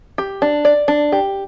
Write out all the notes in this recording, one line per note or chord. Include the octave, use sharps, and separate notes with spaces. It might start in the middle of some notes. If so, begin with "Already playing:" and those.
G4
D4
D5
D4
G4